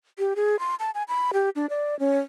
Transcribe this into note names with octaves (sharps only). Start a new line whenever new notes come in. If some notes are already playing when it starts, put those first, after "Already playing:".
G4
G#4
C6
A5
G#5
B5
G4
D4
D5
C#4